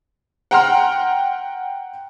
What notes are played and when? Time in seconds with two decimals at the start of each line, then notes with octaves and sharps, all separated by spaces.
0.51 F#5 G5 A#5 C6 F6